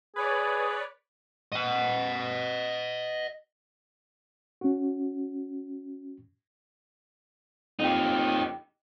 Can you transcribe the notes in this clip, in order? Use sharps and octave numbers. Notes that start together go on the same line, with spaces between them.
G#4 B4 C#5 D5
D#5 F#5
C#4 F#4
F2 D#4 G4